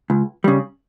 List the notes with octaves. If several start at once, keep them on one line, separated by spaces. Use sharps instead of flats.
C#2
C#3 G3